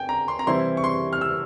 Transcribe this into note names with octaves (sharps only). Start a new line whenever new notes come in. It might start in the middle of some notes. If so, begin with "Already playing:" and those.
Already playing: G5 G#5
A#5
C6
A#5
C3 E3 G3 C4 E4 C6
C#6
C6
F6
E6